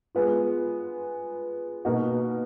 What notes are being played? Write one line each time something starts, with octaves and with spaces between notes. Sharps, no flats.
G#3 B3 F4
B2 A#3 D#4 F#4